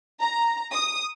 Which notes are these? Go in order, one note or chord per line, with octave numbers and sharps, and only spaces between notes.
A#5
D#6